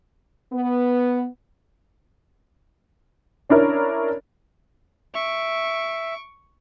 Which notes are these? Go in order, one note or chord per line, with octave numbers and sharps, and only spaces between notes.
B3
C#4 D4 E4 A#4 C#5
E5 C#6 D7